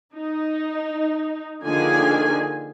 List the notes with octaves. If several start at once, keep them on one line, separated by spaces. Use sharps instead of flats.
D#4
D3 D#3 F3 A#3 G#4 G#5